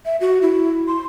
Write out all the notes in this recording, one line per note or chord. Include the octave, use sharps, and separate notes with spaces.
E5
F#4
E4
C6